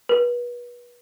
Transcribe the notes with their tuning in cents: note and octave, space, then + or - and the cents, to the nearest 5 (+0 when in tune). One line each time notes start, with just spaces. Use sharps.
B4 -30